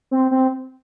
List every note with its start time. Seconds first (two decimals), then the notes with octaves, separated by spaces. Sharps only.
0.11 C4
0.31 C4